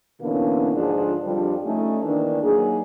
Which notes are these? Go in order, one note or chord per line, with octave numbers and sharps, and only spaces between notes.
B2 D3 E3 A#3 B3 C#4
G#2 D3 F3 D4 F4 G#4
F2 D3 F3 G3
A3 C#4 D#4
D#3 E3 A#3 D4
F#3 A#3 D#4 G#4